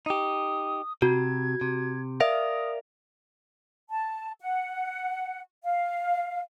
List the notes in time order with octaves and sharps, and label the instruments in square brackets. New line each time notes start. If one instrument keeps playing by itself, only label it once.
[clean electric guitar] D#4 G4 [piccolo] D#6
[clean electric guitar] C3 [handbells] F#4 [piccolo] G#6
[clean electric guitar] C3
[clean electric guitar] A#4 D5 F5 [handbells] E5 [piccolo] D#6
[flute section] A5
F#5
F5